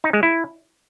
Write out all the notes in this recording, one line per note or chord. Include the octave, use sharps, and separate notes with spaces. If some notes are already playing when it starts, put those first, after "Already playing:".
D#4
G#3
E4